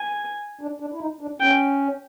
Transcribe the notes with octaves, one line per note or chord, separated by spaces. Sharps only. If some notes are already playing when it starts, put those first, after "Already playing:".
Already playing: G#5
D4
D4
E4
D#4
D4
C#4 G5